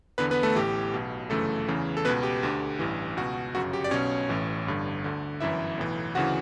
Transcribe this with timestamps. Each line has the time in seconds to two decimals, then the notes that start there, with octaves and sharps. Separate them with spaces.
0.18 E2 D3 B3 B4
0.31 B3 B4
0.43 A3 A4
0.55 A1 A2 E3 G4
0.94 B1 B2
1.30 G1 F#2 C#3 E3 A3 A4
1.68 E2 C#3 E3
1.97 A4
2.05 B2 B3 B4
2.08 C#2
2.23 G4
2.43 D2 D3
2.79 A1 G2 E3
3.17 C#2 B2 F#4
3.54 G1 F#2 C#3 F#4
3.73 G4
3.84 D5
3.91 B1 B2 C#4 C#5
4.29 A1 A2 E3
4.66 G1 G2 D3
5.04 D2 D3
5.40 G1 F#2 E3 E4 E5
5.78 B1 A2 E3
6.15 D2 C#3 E3 F#4 F#5